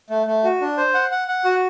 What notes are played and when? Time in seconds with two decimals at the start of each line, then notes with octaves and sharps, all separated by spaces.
0.10 A3
0.27 A3
0.44 F#4
0.61 D4
0.78 C5
0.94 F#5
1.11 F#5
1.28 F#5
1.45 F#4